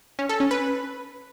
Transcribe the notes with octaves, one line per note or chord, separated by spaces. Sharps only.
C#4
A4
C#4
B4